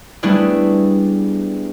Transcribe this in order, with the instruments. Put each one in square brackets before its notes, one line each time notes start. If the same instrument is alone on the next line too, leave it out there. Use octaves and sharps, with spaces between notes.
[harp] G3 A3 B3 D4 E4 G#4